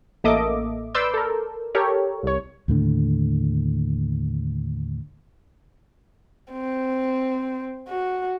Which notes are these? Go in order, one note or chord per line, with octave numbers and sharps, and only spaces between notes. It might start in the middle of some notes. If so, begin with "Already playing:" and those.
A1 A#3 A4 D#5 E5 D6
B4 D5 C6 D6 E6 G6
A4 A#4
G4 A4 A#4 C#5
C2 C#5
D#2 A2 D3
C4
F#4